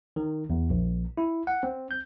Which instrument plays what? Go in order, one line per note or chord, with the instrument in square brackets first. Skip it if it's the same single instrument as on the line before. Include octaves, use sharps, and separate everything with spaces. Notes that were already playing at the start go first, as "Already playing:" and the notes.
[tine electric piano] D#3
E2
A#1
E4
F#5
C4
G6